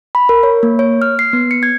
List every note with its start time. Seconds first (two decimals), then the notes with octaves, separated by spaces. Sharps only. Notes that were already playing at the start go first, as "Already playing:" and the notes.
0.15 B5
0.29 A#4
0.43 C#5
0.63 A#3
0.79 C#5
1.02 F6
1.19 C7
1.33 B3
1.51 C#7
1.63 G#6